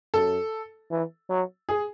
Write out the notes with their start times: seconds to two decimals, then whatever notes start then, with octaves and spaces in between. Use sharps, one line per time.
0.14 F#2 A4
0.91 E3
1.30 F#3
1.69 G#4